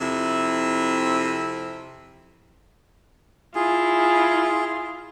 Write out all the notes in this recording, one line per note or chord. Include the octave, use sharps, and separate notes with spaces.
F2 C3 E4
E4 F4 G#4